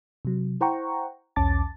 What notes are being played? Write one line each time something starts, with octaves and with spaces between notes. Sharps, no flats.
C3 F#3
E4 C5 F#5 G5 A#5 C#6
B1 E2 C#4 A5 D6 A6